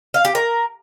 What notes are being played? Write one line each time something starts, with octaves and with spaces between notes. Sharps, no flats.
F5
G4
A#4